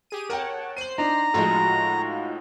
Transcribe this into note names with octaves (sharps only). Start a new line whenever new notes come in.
G4 G#4 D#7
A#4 C#5 F#5 G5 A5
C5 C7 D#7 F#7
D4 D#4 A#5
A2 F3 G#3 D#4 F4 F#4